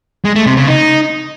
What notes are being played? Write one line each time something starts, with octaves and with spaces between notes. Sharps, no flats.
G#3
A3
C3
C#3
D#4